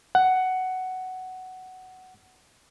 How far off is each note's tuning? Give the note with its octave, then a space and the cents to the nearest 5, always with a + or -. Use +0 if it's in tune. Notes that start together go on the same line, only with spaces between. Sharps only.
F#5 +10